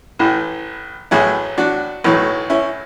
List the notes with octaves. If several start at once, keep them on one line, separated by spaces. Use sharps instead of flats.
A1 A2 E3
A1 A2 F#3 E4 G#4
D4 F#4
B1 A2 F#3
C#4 E4